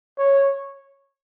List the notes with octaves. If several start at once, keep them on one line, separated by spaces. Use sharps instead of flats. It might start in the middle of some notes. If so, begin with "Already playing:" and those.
C#5